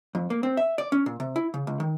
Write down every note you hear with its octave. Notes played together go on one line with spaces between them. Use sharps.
F2
A#3
C4
E5
D5
C#4
A#2
C3
E4
C#3
C#2
D#3